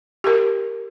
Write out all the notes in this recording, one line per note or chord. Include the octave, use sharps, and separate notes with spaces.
G4 A#4